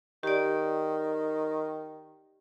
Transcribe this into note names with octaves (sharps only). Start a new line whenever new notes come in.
D#3 G4 D5